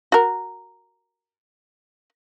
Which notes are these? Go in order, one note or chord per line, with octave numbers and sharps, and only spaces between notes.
F#4 A#4